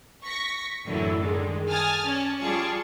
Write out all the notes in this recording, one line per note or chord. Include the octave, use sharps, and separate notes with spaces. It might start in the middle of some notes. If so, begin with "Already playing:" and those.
C#6 A#6 B6
F#2 A2 D3 E3 F#3 E4
D3 D#3 G3 G#3
G#5 A5 D#6 F6 A6
C#4 D5 A5
G3 F4 G#4 A5 C#6